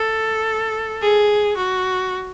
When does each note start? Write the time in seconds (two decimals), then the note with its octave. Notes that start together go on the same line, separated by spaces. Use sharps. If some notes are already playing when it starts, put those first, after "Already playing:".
Already playing: A4
1.01 G#4
1.57 F#4